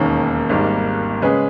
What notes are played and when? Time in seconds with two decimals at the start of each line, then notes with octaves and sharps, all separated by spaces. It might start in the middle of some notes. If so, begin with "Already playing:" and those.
Already playing: E1 D#2 D#3 A#3 C#4
0.49 G#1 G#2 G3 A#3
1.22 C#3 G#3 C#4 G#4 B4